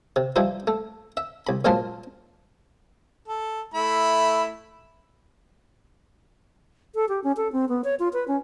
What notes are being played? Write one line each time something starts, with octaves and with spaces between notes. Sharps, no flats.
C3
E3 F3 G3 D#4 E4
A3
E5
C2 B5
F#2 A#2 G#3 F4 C5 A5
A4
A3 E4 B5
A4
G4
C#4
A4
C4
B3
C#5
F4
B4
C#4